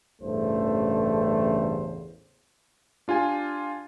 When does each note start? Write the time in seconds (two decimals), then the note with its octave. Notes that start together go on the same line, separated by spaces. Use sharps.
0.22 A1 E2 G2 C#3 A3 C5
3.08 D4 F4 G4 G#5